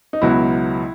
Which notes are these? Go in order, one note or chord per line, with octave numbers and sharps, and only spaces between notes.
D#4
C#2 B2 F#3 B3 E4